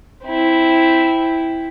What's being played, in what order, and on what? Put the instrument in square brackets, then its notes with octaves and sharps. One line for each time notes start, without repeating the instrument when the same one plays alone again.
[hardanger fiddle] C4 E4